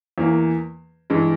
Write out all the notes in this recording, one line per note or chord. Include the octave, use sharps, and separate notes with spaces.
E2 E3 A#3
G2 E3 G#3